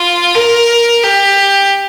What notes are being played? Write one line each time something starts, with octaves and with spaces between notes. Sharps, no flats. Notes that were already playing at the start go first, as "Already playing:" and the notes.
Already playing: F4
A#4
G4